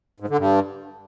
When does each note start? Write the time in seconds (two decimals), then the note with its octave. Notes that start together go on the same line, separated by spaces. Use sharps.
0.20 G#2
0.29 D3
0.38 G2